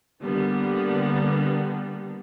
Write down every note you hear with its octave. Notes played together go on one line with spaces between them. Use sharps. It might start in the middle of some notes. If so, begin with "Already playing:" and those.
D3 G3 A#3 B3